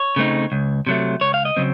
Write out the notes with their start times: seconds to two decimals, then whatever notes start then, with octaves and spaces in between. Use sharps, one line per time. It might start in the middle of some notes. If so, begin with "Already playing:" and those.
Already playing: C#5
0.16 C#3 A3 C4 D#4
0.52 C#2
0.87 C3 F#3 A3
1.21 C#2 C#5
1.34 F5
1.45 D#5
1.57 C#3 F#3 C4